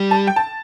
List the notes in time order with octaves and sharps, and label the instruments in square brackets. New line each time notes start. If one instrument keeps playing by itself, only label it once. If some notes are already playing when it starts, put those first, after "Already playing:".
Already playing: [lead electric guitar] G3
[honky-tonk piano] A5
G5
A5